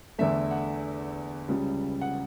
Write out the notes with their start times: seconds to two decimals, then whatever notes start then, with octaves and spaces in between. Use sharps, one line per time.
0.19 E2 D3 A3 E5
0.51 F#5
1.48 C#2 C#3 G3
2.01 F#5